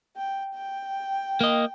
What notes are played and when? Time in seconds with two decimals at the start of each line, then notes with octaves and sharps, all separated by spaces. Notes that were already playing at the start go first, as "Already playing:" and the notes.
0.17 G5
0.54 G5
1.41 A#3 D#5